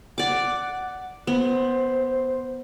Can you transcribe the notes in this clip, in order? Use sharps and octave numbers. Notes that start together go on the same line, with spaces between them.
D5 F#5 D6
B3 C5